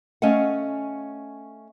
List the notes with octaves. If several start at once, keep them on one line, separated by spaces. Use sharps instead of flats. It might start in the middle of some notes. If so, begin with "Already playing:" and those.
A3 C#4 D#5 F5 F#5